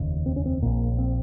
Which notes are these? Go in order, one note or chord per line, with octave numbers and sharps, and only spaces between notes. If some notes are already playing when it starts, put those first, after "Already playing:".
Already playing: F1 D#2 C#3
C4
C#4
C4
A#1 A#2 A#3
C4